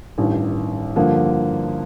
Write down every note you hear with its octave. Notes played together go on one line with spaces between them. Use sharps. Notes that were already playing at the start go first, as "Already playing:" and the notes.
A1 G2 D#3
G2 D3 F3 A#3